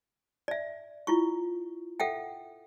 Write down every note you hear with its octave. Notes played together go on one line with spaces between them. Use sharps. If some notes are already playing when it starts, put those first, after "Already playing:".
D5 E5
E4 F4 C#6
A4 E5 F#5 G5